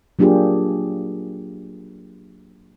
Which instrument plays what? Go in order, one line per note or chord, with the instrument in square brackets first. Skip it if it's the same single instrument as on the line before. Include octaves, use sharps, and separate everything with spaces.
[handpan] F#3 A#3 D4 F4 G4 G#4